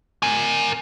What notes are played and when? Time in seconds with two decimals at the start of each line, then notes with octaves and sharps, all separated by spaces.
0.23 A#4 G#5